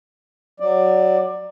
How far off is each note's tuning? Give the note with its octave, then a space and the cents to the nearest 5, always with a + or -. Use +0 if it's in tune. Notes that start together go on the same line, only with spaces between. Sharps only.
F#3 +0 D5 +15